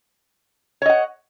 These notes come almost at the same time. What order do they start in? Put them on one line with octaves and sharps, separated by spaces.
C#5 D#5 F#5